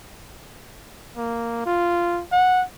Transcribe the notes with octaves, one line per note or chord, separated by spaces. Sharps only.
A#3
F4
F#5